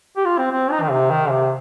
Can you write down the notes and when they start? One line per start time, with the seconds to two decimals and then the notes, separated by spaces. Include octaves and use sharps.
0.17 G4
0.25 F4
0.38 C4
0.51 C4
0.71 D#4
0.82 D#3
0.91 C3
1.11 D#3
1.30 C3